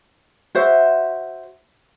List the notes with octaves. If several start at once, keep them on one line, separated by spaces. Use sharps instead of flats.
F#4 C5 E5